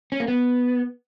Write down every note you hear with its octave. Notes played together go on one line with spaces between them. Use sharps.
C#4
A#3
B3